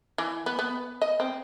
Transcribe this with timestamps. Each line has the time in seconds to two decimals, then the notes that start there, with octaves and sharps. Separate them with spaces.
0.18 E3
0.46 B3
0.59 B3
1.02 D#5
1.20 C4